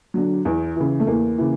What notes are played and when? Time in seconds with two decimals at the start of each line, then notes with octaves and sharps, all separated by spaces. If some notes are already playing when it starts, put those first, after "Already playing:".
0.14 D3 F#3
0.45 E2
0.76 C#3 E3
1.00 A3
1.07 E2 A#3
1.38 C#3 E3